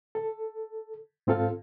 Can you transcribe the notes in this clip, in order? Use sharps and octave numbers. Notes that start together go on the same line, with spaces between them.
A4
G#2 C4 F4 A4 F5